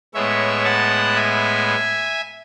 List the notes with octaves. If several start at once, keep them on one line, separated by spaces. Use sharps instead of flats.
A2 G#3 B3 C#5 E5
F#5 A5
E5 G#5